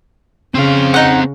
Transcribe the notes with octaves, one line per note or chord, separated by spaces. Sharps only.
C#3 C4 F5
D#4 F#5